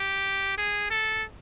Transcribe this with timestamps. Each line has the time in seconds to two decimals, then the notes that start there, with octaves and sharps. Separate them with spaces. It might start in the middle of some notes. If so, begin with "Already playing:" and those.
Already playing: G4
0.58 G#4
0.90 A4